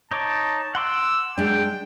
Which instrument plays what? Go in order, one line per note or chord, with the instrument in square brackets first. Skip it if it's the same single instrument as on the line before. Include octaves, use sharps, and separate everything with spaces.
[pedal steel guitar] D#4 C#5 D6 [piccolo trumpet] A5
[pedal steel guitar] F#5 C6 D6 [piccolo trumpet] E6
[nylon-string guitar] G#3 D4 [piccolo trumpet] G5